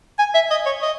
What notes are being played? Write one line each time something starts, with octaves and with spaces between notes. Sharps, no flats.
G#5
E5
D#5
C#5
D#5